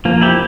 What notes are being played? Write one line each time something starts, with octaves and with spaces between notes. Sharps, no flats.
F3 A#3
E4 G4